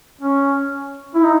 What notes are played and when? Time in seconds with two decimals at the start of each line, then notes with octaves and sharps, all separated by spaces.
0.21 C#4
1.15 E4
1.23 D#4